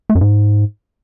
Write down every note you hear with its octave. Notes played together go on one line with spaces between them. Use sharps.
A3
F#2
G#2